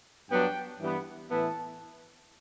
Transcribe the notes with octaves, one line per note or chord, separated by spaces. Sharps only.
G2 F#3 B3 D4 G5
G2 E3 G3 B3
A2 E3 B3 E4 A5